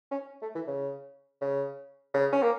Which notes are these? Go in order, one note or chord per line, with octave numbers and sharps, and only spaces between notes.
C#4
A3
E3
C#3
C#3
C#3
C#4
A#3